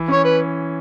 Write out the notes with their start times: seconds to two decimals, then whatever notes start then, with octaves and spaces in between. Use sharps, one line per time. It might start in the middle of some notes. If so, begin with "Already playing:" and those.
Already playing: E3
0.08 C#4 C#5
0.24 B4